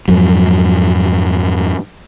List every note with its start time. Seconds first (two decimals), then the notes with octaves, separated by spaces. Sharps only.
0.08 F2 G#2 F3 F#3